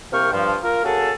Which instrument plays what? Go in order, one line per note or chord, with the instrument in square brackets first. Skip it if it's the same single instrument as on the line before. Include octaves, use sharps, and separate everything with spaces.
[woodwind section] C2 C3 A#3 G5 C#6 F6
G2 F3
F4 A#4
A#3 C#4 F#4 G#4 A4